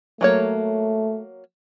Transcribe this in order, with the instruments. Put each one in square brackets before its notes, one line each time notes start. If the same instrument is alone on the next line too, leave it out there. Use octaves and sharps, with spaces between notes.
[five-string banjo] F#3 A#3 C#5 [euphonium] A3